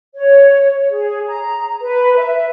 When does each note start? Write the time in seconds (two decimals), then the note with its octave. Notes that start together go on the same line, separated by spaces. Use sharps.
0.15 C#5
0.90 G#4
1.27 A#5
1.81 B4
2.18 E5